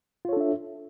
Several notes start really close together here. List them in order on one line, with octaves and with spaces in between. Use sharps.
F4 C#5 A4 D4 E5